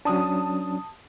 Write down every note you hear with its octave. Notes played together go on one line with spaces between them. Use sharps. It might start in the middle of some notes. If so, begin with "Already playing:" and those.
F#3 C#4 D4 A5 D#6